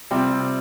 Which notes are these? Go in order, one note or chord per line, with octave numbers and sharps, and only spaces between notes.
C3 G3 C4 F4